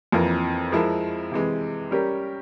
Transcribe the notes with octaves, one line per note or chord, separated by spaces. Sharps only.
F2 E3 A#3 F4 A#4
F3 G#3 E4 A#4
C3 E3 G#3
G3 C#4 G4 A#4